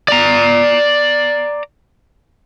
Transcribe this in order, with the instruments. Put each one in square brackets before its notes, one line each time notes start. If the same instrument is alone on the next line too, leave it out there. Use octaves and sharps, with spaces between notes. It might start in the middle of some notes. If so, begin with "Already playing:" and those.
[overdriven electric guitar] D5 A#5